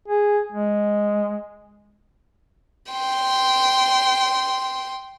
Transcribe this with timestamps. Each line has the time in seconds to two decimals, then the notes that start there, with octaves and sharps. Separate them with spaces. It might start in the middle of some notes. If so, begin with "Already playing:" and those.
0.08 G#4
0.52 G#3
2.92 G5 C6